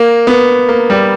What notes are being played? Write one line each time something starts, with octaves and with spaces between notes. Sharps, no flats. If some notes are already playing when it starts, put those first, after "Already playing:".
Already playing: A#3
B3
A#3
G3